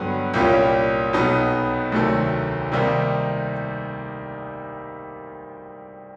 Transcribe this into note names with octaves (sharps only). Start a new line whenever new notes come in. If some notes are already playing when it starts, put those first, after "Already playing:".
Already playing: G2 D3 F#3 B3
C2 A#2 G3 A#3 C#4
B1 B2 F#3 B3 D#4
D2 C3 D#3 F#3 A3
C3 D#3 G3 A#3 D#4